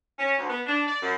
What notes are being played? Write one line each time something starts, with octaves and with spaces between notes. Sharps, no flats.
C#4
D2
B3
D4
D5
F#2